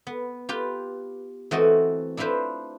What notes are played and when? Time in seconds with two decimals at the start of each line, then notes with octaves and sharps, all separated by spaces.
0.07 B3
0.49 F4 G4 B4
1.51 E3 A3 C4 F#4 D#5
2.17 D4 E4 F4 B4 C5